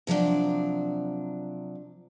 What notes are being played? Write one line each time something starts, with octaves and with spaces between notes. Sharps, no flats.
C3 F3 F#3 D4